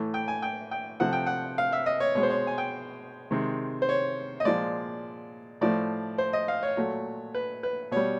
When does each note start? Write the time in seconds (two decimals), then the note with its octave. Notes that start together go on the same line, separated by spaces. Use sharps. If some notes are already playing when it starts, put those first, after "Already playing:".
Already playing: A2 E3 A3
0.14 G5
0.28 G#5
0.42 G5
0.71 G5
1.00 C3 F3 A3 F#5
1.13 G5
1.26 F#5
1.58 F5
1.72 E5
1.86 D#5
2.00 C#5
2.15 B2 G#3 C#5
2.23 C5
2.30 C#5
2.47 G#5
2.58 G5
3.31 C3 D#3 G#3
3.82 C5
3.89 C#5
4.40 D#5
4.45 A#2 F3 G#3 D5
5.61 A2 F3 A3 D5
6.18 C5
6.33 D#5
6.48 F5
6.63 C#5
6.77 A#2 F#3 A3
7.35 B4
7.63 B4
7.91 B2 G3 C#5